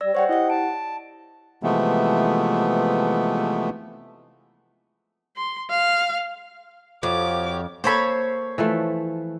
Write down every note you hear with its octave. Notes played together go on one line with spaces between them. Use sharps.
G3 D5 E6 A#6
G3 C5 C#5 F#5 G5
E4 G4 D#5 F#5
A5 D7
C3 E3 F3 G#3 A3 B3
C6
F5
F2 F3 F#4 G4 C#5 D6
A#3 A4 C5 C#5 B5
E3 F3 A3